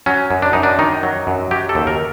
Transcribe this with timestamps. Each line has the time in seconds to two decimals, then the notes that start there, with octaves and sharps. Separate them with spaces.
0.06 F#3 C#4
0.31 F#2
0.42 D4
0.53 F#2 D#4
0.63 D4
0.79 D#3 D#4
1.03 F#3
1.27 F#2
1.51 F#3 G4
1.69 A4
1.75 D#2
1.87 A#4